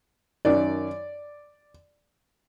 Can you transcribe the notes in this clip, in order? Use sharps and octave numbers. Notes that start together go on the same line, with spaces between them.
F#2 D#3 D5